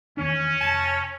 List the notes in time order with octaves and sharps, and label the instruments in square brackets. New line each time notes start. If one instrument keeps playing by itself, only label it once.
[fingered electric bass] E2 D#3 D4 [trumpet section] C#4
[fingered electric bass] F1 [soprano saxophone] A5